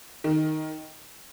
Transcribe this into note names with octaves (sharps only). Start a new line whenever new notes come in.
D#3